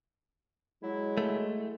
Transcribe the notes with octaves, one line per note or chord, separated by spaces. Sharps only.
F#3 G#3 E4
A3